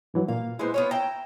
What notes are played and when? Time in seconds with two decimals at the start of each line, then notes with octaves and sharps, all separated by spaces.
0.14 G2 E3 F#3
0.28 A#2 A#3 F5
0.59 G#3 B3 E4 C5
0.74 B3 F4 C#5
0.91 E4 G5 A#5